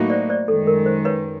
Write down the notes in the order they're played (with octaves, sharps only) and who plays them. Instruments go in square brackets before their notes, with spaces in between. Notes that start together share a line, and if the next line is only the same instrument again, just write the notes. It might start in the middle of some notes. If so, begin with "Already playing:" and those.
Already playing: [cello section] A2 F#3 A#3 D#4 F#4
[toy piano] C5 D5
C5 D5
[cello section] F#2 D#3 G#3 [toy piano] A4
[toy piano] A#4
C5
B4 C#5